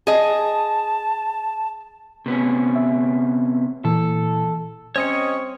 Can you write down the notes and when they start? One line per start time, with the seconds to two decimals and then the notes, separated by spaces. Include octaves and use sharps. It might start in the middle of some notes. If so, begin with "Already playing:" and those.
0.07 G#4 D#5 A5
2.26 C3 B3 C#4
2.76 E5
3.85 A#2 E3 A4
4.96 G3 C4 C#4 C#5 D#5 C#6